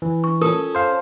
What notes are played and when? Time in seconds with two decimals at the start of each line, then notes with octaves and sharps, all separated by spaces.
0.02 E3
0.24 C#6
0.41 C#4 F4 A4 A#4 D#6
0.75 C5 F5